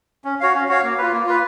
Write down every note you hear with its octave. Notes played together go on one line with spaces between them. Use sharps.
C#4
F#4 C#5 F5
C#4
F#4 C#5 F5
A#3
F4 B4
A#3
F4 B4